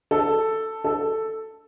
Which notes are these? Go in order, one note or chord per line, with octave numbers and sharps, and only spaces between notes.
A4
A4